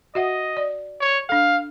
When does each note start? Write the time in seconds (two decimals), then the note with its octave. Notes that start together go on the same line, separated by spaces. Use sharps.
0.15 F#4 D#5 E5 F#5
0.57 D5
1.01 C#5
1.29 D4 A4 F5